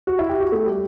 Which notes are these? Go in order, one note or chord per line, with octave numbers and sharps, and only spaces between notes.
F#4
E4
G4
F#4
A3
G3